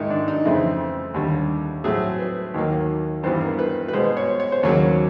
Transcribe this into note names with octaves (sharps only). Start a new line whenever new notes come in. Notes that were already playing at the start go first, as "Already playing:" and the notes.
Already playing: G#2 D#3 G#3 D#4 E4
D4
D#4
F2 C#3 E3 A3 C4 E4
D#2 D3 G3
A2 F#3 A3 C4 G#4
B4
D#2 D#3 F#3 A#3
G2 E3 G3 B3 C5
A#4
B4
B4
B2 G#3 B3 C5
C#5
C#5
C5
D#2 C#3 F#3 A#3 C#5